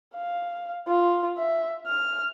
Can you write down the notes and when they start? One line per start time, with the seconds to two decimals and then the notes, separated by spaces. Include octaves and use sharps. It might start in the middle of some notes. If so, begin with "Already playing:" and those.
0.15 F5
0.87 F4
1.37 E5
1.86 F6